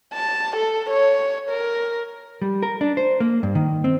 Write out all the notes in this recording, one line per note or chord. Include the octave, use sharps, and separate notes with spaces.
A5
A4
C#5
A#4
G3
A#4
D4
C5
A#3
G2
D#3
C4